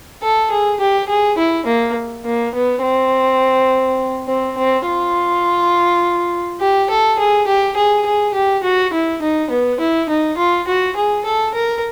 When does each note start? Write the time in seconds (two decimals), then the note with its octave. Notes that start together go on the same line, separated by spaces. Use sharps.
0.22 A4
0.51 G#4
0.80 G4
1.09 G#4
1.38 E4
1.66 A#3
2.25 A#3
2.54 B3
2.82 C4
4.28 C4
4.57 C4
4.87 F4
6.60 G4
6.90 A4
7.19 G#4
7.47 G4
7.76 G#4
8.06 G#4
8.34 G4
8.64 F#4
8.93 E4
9.22 D#4
9.50 B3
9.80 E4
10.09 D#4
10.38 F4
10.67 F#4
10.96 G#4
11.25 A4
11.54 A#4